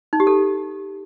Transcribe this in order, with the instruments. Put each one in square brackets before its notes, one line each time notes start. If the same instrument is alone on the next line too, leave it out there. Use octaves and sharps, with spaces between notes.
[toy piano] D#4
G4
A4